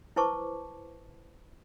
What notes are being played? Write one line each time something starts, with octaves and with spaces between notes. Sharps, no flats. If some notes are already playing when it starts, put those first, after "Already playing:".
E4 B4 C5 A5 C#6 D6